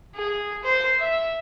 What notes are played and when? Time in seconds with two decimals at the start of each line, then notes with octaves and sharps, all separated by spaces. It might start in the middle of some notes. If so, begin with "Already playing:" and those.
0.16 G#4
0.63 C5
0.99 E5